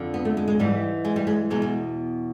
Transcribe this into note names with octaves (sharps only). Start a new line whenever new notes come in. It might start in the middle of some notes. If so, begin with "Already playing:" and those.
Already playing: F2 D3
B3
A3
G#3
G#3
G#2 E3 G3
G#3
G3
G#3
E2 B2 G#3
G#3